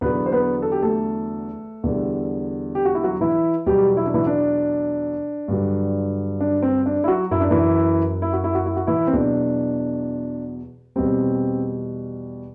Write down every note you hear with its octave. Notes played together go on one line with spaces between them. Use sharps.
E2 D3 F#3 B3 B4
C5
B3 B4
A4
G4
A3 A4
E2 D3 G3
G4
F#4
E4
F#3 F#4
E3 E4
E2 B2 F#3 G3 G4
E4
D4
E3 E4
D4
G2 D3 F#3
D4
C4
D4
E4
F#3 F#4
F#2 F#3 E4
D4
E3 E4
E4
F#4
E4
F#4
E4
F#4
E3 E4
C4
E2 B2 F#3 D4
E2 B2 G3 C4